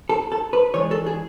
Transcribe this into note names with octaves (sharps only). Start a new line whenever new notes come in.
A4
A4
B4
E3 G#3 D4 C#5
A4
G#4